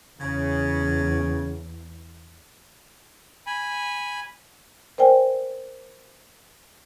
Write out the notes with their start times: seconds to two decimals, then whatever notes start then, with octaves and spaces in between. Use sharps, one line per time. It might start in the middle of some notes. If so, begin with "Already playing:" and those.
0.20 E2 C#3
3.47 G#5 B5
4.98 A#4 C5 D5 G5 G#5